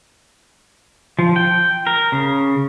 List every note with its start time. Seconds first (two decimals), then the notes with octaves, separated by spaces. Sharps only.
1.19 F3
1.36 G5
1.87 A#4
2.12 C#3